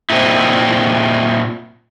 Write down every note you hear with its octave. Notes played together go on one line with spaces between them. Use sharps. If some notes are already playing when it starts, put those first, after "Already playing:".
A#2 C4 D#4 E4